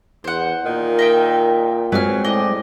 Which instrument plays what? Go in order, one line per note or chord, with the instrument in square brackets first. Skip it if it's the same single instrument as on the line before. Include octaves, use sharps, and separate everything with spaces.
[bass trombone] E2 [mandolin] C5 F#5
[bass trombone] A#2 [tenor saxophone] D#3
[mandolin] D#5 E5 G5
[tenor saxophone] F#3 [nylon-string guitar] G#3 C4 [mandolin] B4 F6
[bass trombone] A2 [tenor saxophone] D5 [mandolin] D#5